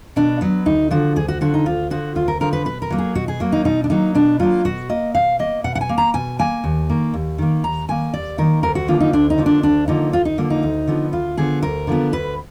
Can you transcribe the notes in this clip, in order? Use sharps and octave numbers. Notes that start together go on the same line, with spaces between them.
B2 D4
F#3 B3
D2 D#4
D3 F3 F#4
D2 G#4
F#4
D3 F3 F#4
D#4
D2 F4
D3 F3 F#4
D2 F4
A#4
D3 F3 A#4
B4
B2 B4
A#4
F#3 A#3
G#4
B2 F#4
G#4
F#3 A#3
D#4
B2 D#4
D4
F#3 A#3 D#4
B2 D4
F#3 A#3 F4
B2 F#4
A#3 D#5
B2 F5
A#3 D#5
B2 F#5
F#5
G#5
A#3
A#5
B2 G#5
A#3 G#5
D#2
D#3 A#3
D#2
D#3 A#3
D#2 A#5
D#3 A#3 G#5
D#2 D5
D#3 A#3 A#4
D2 A#4
F#4
D3 F3 A#3 F4
D#4
D2 D4
D#4
D3 F3 A#3
D4
D2 D4
D3 F3 A#3 D#4
D2 F4
D#4
D3 F3 A#3
D#4
D2
D3 F3 B3
D2 F4
D3 F3 B3 G#4
D2 A#4
D3 F3 B3
D2 B4